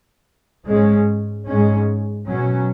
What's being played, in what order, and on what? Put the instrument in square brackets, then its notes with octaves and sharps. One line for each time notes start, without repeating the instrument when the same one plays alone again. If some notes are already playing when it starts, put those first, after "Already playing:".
[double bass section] G#2 G#3 C#4
G#2 G#3 C#4
B2 F#3 C#4